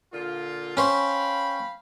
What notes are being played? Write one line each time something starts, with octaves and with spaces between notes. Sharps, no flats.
A#2 D3 F4
C#4 C5 F5 G5 B5